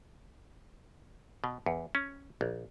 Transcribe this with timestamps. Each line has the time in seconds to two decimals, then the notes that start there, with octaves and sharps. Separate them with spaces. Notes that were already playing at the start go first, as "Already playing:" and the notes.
1.44 B2
1.66 E2
1.95 C#4
2.41 A#1